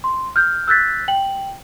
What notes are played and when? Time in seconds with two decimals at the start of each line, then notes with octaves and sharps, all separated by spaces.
0.04 C6
0.36 F6 G6
0.68 E6 F#6 G6 A6 B6
1.08 G5 F#7